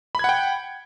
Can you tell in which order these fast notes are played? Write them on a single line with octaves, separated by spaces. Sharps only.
B5 G#6 F#5 G5